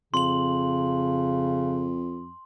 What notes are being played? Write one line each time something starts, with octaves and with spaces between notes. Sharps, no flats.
F2 C#3 C6 F#7